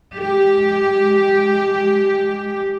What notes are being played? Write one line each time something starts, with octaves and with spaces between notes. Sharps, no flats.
G#3 G4